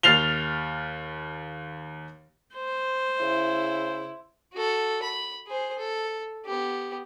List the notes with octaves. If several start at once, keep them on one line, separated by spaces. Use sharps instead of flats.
D#2 F6 A6 C7 F7 G7
C5
C#3 E4
F#4 A4
B5
G#4 C5
A4
B3 G4